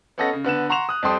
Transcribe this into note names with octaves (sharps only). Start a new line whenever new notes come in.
B3 C#4 A4 D#5 F#5 A#6
C#3
D3 B3 F#6 E7
F#5 A#5 C6 C#6 E7 F7
D#6 F#6
F2 G3 A4 G5 C6 D#6